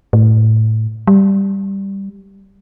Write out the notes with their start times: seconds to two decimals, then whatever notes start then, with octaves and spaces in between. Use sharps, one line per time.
0.13 A2
1.07 G3